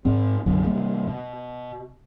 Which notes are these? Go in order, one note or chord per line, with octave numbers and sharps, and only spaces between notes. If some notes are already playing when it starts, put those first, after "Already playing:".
G#2 C4
B1 F#2 D3 F#3
C3 G3 A#3
B2